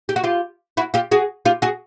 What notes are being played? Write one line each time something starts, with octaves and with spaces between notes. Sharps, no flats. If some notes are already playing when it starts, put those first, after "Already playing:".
G4
F#4
F4 G4
E4 F#4
F4 G4
F#4 G#4
F4 G4
F#4 G#4